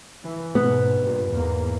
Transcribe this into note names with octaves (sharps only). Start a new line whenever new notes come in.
E3
G#2 B2 B3
G2 A#2
E2 G#2 A#3